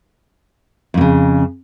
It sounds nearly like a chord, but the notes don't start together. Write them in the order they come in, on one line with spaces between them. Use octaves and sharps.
F2 A2 C#3